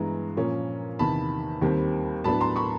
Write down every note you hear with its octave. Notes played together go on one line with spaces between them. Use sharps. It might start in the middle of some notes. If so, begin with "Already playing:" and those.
Already playing: G2 E3 G#3 B3 A#5
A#2 F3 A#3 C#4
E2 C3 D#3 A5 B5
D#2 D#3 G3 C4
A2 F#3 B3 D4 A5 B5
A#5 C6
B5 C#6